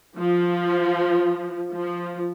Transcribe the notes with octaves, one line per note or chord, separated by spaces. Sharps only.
F3
F3